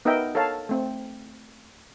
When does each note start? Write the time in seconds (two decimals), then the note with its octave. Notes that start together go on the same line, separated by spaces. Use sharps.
0.05 B3 D#4 A#4 D#5 E5 G5
0.35 A4 A#4 C#5 F5 A5
0.69 A3 C4